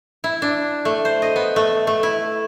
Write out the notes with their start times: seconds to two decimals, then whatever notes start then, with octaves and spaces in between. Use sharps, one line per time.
0.24 E4
0.42 D4
0.85 A3
1.05 C5
1.22 D#5
1.36 B3
1.56 A3
1.87 A3
2.03 E4